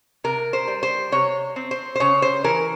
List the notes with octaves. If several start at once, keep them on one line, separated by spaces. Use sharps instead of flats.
C3 A#4
C5
G3
C5
C3 C#5
C4
C5
C5
C#3 C#5
C5
E3 A#4